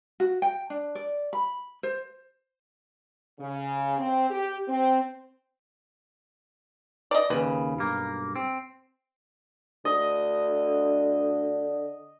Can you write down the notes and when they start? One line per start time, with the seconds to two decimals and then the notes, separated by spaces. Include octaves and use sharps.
0.20 F#4
0.42 G5
0.70 D4
0.95 D5
1.33 B5
1.83 C5
3.39 C#3
3.98 C4
4.29 G4
4.68 C4
7.11 D5 D#5
7.30 D#2 C#3 B4
7.78 B1 G2 A#3
8.36 C4
9.85 D2 D3 D#5